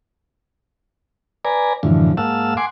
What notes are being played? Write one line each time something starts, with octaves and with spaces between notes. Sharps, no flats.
B4 D5 G#5 A#5
F#2 A2 D3 E3 F3
G#2 A#3 F5 F#5 A5 E6
F#5 G#5 C6 D6